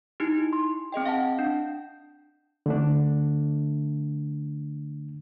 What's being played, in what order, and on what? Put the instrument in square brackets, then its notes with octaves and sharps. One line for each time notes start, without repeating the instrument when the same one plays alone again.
[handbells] D#4 E4 G4
C6
C4 G#4 D#5 G5
F5 F#5 A5
D4
[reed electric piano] D3 A3 D4